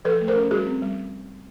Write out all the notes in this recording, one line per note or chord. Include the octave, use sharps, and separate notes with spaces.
F3 A4 B4
A3
A#4 C5
C#4
G3 F#4 G#4
C4
G3